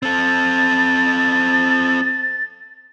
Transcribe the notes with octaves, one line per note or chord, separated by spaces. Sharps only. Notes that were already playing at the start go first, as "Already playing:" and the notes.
C4 A4 A6